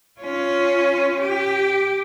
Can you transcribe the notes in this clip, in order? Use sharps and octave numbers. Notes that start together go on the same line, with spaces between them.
C#4 F4
G4